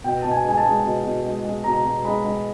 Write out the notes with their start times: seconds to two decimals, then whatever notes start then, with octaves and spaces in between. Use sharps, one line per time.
0.04 B2 G5
0.22 B2 A5
0.31 G#5
0.44 G#3 G#5
0.57 A5
0.64 G#3
0.84 B2
1.04 B2
1.24 G#3
1.44 G#3
1.64 B2 A#5
1.85 B2
2.04 G#3 B5
2.24 G#3